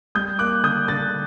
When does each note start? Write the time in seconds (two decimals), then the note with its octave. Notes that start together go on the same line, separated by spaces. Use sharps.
0.15 G3 D#6 G6
0.39 A#3 D6 F#6
0.63 D3 D#6 G6
0.88 D3 F#6 A6